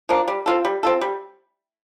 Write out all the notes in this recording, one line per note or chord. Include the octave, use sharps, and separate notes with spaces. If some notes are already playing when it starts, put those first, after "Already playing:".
F3 A#3 D4
G3
C4 F4 A4
G3
C4 F4 A4
G3